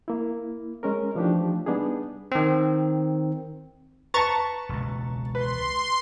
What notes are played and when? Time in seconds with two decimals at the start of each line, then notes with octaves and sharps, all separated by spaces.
0.08 A#3 E4
0.83 G#3 C#4 A#4
1.15 E3 F3 A3 D4 D#4 G4
1.66 G3 B3 D4 D#4 G#4
2.32 D#3 C4
4.14 B4 A5 A#5 C#6 A6
4.69 E1 C#2
5.35 B4 C6